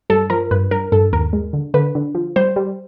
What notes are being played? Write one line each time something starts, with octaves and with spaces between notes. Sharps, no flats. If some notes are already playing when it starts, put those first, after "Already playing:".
G2 A4
F3 A#4
G2 B4
G2 A#4
G2 A4
D#2 A#4
G#3
D3
D3 B4
D3
F3
G3 C5
G3